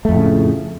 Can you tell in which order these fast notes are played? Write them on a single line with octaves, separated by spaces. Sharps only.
A3 F2 A2 C#3